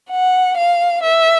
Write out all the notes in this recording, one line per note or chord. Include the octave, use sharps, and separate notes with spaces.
F#5
F5
E5